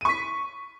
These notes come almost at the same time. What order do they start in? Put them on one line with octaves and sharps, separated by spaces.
D#7 C#6 B6